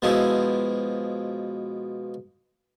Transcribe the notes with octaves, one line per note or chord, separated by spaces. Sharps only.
B2 F3 G#3 E4